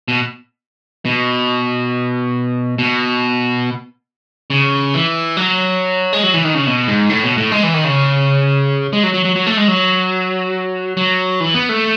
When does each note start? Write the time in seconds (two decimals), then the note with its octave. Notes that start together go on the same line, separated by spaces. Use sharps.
0.08 B2
1.05 B2
2.79 B2
4.50 C#3
4.94 E3
5.37 F#3
6.13 G#3
6.23 F#3
6.34 E3
6.44 D#3
6.55 C#3
6.67 B2
6.87 G#2
7.09 A2
7.24 B2
7.37 A2
7.52 G#3
7.63 E3
7.74 D#3
7.84 C#3
8.93 G#3
9.03 F#3
9.14 F#3
9.25 F#3
9.36 F#3
9.46 A3
9.57 G#3
9.68 F#3
10.97 F#3
11.40 E3
11.54 B3
11.69 A3